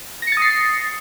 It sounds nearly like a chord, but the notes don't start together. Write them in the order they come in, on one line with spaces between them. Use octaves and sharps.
A#6 C#7 A6 D#6 C7